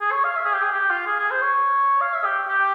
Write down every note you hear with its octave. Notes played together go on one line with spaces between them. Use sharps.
G#4
C#5
F5
E5
G#4
G4
G#4
G4
F4
G#4
G#4
C5
C#5
F5
E5
G4
G4